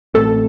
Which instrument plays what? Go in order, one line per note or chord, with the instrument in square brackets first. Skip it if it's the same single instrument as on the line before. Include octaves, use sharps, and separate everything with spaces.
[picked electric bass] A1 A2 A3 C4 [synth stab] A4